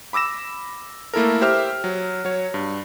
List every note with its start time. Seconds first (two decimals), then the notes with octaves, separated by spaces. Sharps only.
0.13 B5 D6 E6 A#6 E7
1.14 A3 A#3 E4 A4 A#4
1.41 G4 C5 E5 F6
1.84 F#3
2.25 F#3 C#5
2.54 G2